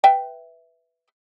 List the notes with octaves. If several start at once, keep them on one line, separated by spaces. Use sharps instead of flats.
B4 E5 G5